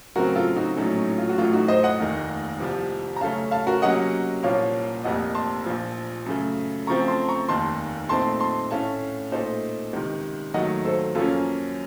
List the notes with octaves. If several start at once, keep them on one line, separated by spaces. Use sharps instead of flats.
C#3 F#3 A3 C4 F#4 A#4
F4 A4
D#4 F#4
A#1 A2 F#3 A3 C#4 D#4
D#4
F4
F#4
A1 A2 F#3 A3 F4
D#4 F#4
C5 D#5
D#5 F#5
F1 D#2 D#3 A#3
C2 C3 F3
A#5
F#2 C#3 A3 C#4 F5 A5
F5 A5
F#4 A#4
C3 F#3 A#3 C#4 F#4 D#5 F#5
C2 A#2 F3 A#3 C#5 F5
F1 F2 C3 F3 A#3 D#5 F#5
A5 C6
A#1 A#2 F3
F#2 C#3 A3
C#3 F3 A3 C4 A#5 C#6
A5 C6
A#5 C#6
F1 D#2 D#3 A5 C6
A#2 A3 C4 D#4 A5 C6
A5 C6
A2 A3 C#4 F5 A5
A#2 A3 D#4 A4 C5
C#2 C3 D#3
D#2 D#3 F#3 A3 D#5 F#5
A4 C5
F#2 F3 A#3 C#4 F4 A4